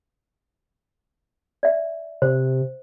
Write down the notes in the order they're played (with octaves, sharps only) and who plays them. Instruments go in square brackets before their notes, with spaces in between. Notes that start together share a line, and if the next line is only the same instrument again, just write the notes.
[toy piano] D5 E5
[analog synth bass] C3 [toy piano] C5